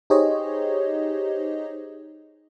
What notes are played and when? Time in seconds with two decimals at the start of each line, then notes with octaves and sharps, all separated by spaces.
0.10 D#4 G4 G#4 C5 C#5 D#5